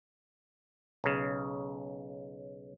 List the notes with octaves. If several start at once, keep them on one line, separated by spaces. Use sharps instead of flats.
B1 C#3